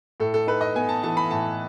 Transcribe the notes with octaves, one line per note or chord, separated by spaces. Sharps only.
A2 A4
A4
D#4 B4
D#5
B3 G#5
A5
E3 A5
B5
A2 A5